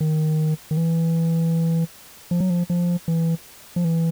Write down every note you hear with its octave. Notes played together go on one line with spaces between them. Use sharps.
D#3
D#3
E3
F3
F#3
F3
F3
E3
F3
E3